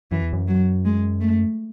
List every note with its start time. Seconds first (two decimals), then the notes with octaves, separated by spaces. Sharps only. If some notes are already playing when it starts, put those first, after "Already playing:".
0.12 F#2 E3
0.22 E2
0.33 F#2
0.48 F#3
0.85 G#3
1.21 A3